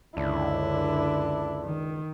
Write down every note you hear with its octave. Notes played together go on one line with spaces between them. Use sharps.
C#2 F#2 D3 D4 E4
D#3